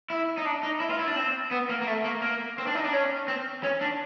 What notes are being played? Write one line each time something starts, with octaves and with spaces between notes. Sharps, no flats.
E4
D#4
D4
D#4
E4
F4
E4
D4
C4
B3
A#3
A#3
A3
A#3
A#3
C4
D4
D#4
D4
C#4
C4
C#4
D4